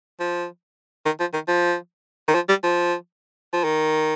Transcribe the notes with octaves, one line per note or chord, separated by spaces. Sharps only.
F3
D#3
F3
D#3
F3
D#3
F3
G3
F3
F3
D#3